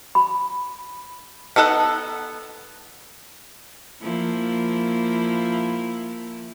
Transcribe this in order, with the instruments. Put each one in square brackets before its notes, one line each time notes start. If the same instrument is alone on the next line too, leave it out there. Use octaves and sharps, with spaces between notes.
[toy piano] B5
[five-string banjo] B3 D#4 A4 B4 F#5
[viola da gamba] F3 A#3 E4